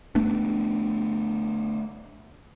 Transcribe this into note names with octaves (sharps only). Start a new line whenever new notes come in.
A3 B3 D4